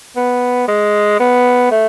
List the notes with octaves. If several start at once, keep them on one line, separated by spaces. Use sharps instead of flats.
B3
G#3
B3
A3